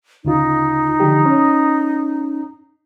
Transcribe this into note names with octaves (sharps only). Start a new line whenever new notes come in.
D2 C#3 D#4 F4
D3 F3 G4
C#4